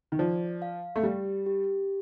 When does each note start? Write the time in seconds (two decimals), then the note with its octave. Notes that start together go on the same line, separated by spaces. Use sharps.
0.12 D#3
0.19 F3 D5
0.62 F5
0.96 A3
1.03 G3 G4
1.46 G4